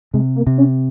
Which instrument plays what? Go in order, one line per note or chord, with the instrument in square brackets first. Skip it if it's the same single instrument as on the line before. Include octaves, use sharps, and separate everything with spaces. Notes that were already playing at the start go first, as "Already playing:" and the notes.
[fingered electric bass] C3 [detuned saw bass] G#3
[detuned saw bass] A#3
[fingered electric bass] C3
[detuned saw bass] C#4